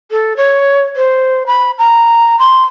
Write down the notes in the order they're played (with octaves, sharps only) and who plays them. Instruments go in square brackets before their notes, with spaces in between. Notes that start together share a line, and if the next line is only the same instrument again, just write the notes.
[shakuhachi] A4
C#5
C5
B5
A#5
C6